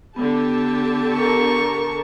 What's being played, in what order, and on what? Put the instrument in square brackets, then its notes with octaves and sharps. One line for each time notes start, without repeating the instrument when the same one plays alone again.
[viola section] D3 G4 A5 [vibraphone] B3
[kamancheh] A#4 C#6